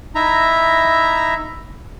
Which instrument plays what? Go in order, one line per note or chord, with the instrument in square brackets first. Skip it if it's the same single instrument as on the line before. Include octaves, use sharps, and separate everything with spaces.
[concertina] D#4 E4 E5 A#5